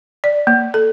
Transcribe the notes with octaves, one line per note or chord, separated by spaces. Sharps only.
D5
A#3
A4